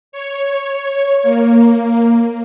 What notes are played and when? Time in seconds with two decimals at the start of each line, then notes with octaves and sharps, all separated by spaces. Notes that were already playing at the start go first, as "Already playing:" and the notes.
0.12 C#5
1.23 A#3